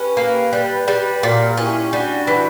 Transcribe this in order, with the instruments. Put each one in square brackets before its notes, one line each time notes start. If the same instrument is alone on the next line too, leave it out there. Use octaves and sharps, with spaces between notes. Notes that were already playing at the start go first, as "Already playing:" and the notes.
Already playing: [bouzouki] C#4 [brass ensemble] G4 B4
[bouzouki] A#3
[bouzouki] G3 [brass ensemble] G4 B4
[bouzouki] G3 [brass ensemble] G4 B4
[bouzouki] A#2 [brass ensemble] F#4 A#4
[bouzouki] C#4 [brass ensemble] E4 G4
[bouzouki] G3 [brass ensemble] D4 F#4
[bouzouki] E3